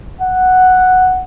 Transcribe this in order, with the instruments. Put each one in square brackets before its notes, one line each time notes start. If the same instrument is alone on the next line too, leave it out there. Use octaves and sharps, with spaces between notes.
[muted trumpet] F#5